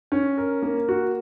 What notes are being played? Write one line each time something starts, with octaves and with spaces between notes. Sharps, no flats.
C#4
A#4
A#3
F#4